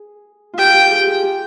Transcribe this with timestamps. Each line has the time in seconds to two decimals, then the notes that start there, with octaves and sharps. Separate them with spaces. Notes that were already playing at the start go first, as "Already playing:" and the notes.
Already playing: G#4
0.54 F4 G4 G5
0.74 G4
0.90 G#4
1.07 G#4
1.23 G4